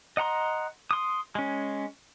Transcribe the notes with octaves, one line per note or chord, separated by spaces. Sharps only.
D#5 F#5 A#5 C6
C6 D#6
G#3 C#4